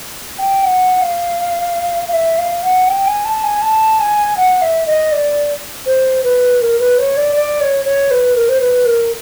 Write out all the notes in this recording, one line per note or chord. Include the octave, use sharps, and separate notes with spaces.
G5
F#5
F5
F5
E5
F5
F#5
G5
G#5
A5
G#5
A5
G#5
F#5
E5
D#5
D5
C5
B4
A#4
B4
C#5
D5
D5
C#5
C#5
B4
A#4
C5
B4
A#4